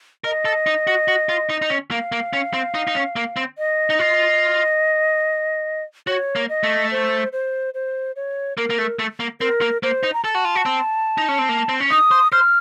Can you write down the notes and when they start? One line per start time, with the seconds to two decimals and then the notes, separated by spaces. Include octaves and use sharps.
0.24 A#4 D#5
0.45 A4
0.67 D#4
0.87 F#4
1.08 F#4
1.29 F4
1.50 D#4
1.62 D#4
1.70 C#4
1.91 A#3 F5
2.12 A#3
2.33 C#4
2.54 C4
2.74 D#4
2.87 D#4
2.95 C#4
3.16 A#3
3.36 C4
3.58 D#5
3.90 D#4
3.99 F4
6.07 F#4 C#5
6.36 A#3
6.49 D#5
6.64 A3
6.91 C5
7.32 C5
7.74 C5
8.16 C#5
8.57 A#3 A#4
8.70 A#3
8.78 A3
8.99 A3
9.20 A#3
9.40 C4 A#4
9.61 A#3
9.83 A#3 C5
10.03 D#4
10.13 A#5
10.24 A4 A5
10.35 F#4
10.45 F4
10.55 F#4
10.65 C4
11.18 D#4
11.29 C#4
11.39 C4
11.49 A#3
11.69 C4
11.80 C#4
11.91 D#4 D#6
12.11 C5
12.32 C5 F6